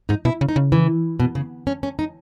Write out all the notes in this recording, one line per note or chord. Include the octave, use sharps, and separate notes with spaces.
G#2 D#4
B2 E4
C#3
D#4
C#3
E3
B2
C#3
C#4
C#4
D#4